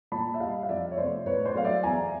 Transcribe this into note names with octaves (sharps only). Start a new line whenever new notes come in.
A#2 A5 B5
E5
G3 D#5 F5
F5
F2 D5 E5
C#5
C3 F3 A3 C5 D5
A2 B4 C#5
C5 D5
F#3 A3 F5
D5 E5
E2 G#5 A#5